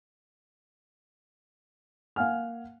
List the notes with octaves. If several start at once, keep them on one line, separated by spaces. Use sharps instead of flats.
A#3 F5 F#5 G#5 F6